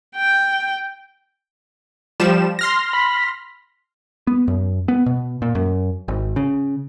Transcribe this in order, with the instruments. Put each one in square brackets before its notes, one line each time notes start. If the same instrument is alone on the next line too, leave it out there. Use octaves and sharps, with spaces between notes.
[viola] G5
[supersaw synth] F3 G3 E7
C6 F6 A#6
[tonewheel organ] B5
[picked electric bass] B3
F#2
B3
B2
A#2
F#2
G#1
C#3